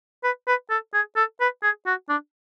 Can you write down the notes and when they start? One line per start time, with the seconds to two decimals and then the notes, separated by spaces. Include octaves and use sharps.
0.24 B4
0.47 B4
0.70 A4
0.94 G#4
1.16 A4
1.41 B4
1.63 G#4
1.86 F#4
2.09 D4